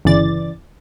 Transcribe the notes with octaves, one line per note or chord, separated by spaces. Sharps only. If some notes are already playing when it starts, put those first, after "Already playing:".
G1 C#3 E3 D5 A6